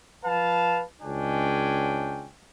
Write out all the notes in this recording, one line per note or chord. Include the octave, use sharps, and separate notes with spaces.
F3 B4 F5 A5
C#2 G#3 C#4 D4 G5 G#5